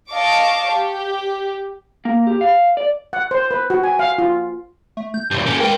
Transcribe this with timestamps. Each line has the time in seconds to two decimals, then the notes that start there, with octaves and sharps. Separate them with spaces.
0.11 D#5 F5 A5 C#6 D6
0.70 G4
2.05 A#3
2.27 G4
2.41 F5
2.77 D5
3.13 F#5
3.31 C5
3.51 B4
3.70 F#4
3.83 G#5
3.99 F5
4.18 F4
4.97 A3
5.14 G6
5.31 G2 A#2
5.46 A#3 C#4
5.60 A#4 B4 G5